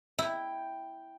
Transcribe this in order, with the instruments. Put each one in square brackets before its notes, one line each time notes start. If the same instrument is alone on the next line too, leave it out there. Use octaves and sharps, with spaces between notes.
[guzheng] E4 [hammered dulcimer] G5